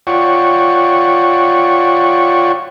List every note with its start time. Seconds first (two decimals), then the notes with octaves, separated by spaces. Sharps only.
0.07 F4 C#5 D5 F#5 G5 C#6